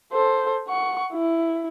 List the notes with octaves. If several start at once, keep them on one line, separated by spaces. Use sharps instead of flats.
A4 C5
F#5 C#6
E4